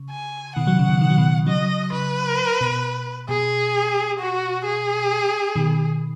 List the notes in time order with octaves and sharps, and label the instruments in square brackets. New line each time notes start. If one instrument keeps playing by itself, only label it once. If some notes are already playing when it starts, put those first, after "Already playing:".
Already playing: [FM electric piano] C#3
[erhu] G#5
[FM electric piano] B2 D#3 [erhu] F#5
[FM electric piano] C#3 F#3
C#3
B2 D#3
D#3
F#3
B2 D#3
[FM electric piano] C#3 F#3 [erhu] D#5
[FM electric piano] C#3 [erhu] B4
[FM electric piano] B2
[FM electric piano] B2 [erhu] G#4
[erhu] F#4
G#4
[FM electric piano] B2 D#3